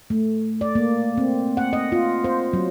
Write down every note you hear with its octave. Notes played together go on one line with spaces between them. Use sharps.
A3
D5
A#3
C4
F#5
D#5
F4
C5
F#3